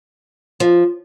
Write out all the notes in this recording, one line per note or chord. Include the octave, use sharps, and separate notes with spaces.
F3